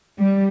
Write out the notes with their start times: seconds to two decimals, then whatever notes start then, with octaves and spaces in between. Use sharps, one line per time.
0.19 G3